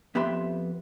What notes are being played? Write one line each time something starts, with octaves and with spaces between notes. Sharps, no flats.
F2 B3 G4 E5 B5 C6